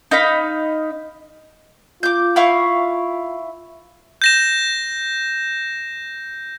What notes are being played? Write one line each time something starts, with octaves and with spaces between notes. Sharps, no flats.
D#4 D#5 F5 B5
F4 D6 G6
E4 F5 C#6
G6 A#6 E7